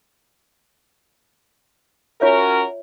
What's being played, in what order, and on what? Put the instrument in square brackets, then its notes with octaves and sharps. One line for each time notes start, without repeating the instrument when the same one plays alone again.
[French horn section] C#4 F#4 A#4 [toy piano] F4 C#5 E5